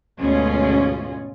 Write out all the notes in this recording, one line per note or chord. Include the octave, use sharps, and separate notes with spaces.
D2 G#2 B2 C#4 F4 G#4